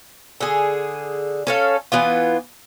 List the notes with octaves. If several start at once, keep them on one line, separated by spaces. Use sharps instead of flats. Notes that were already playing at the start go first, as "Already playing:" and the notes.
D3 G#4
C#4 A4 F5
E3 B3 F4